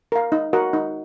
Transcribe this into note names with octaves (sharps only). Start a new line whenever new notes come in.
A#4 F5
D#4
F#4 A#4 D#5 F#5
D#4